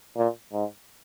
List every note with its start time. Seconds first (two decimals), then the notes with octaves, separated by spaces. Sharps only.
0.16 A#2
0.53 G#2